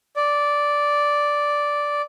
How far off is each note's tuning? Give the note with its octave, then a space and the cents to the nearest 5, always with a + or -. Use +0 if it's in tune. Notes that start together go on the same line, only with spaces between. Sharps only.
D5 -5